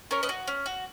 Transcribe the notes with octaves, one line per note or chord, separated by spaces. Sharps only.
C#4 A#4 C#5
B4 D#5
F#4
C#4
F#4